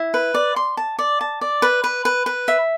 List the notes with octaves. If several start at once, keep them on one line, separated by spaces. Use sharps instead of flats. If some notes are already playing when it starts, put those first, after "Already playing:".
Already playing: E4
B4
D5
C6
A5
D5
A5
D5
B4
B4
B4
B4
E5